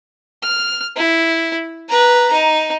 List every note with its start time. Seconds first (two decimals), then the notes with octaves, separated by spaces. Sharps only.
0.43 F6
0.96 E4
1.89 B4 A#5
2.33 D#4